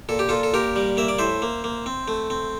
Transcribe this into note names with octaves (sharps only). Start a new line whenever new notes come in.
A#2 A4
G4
A#2 F4 A4
A4
A#2 G4 A#4
G3
A#3 E5
D5
A2 C5 E5
A#3
A#3
C4
A3
C4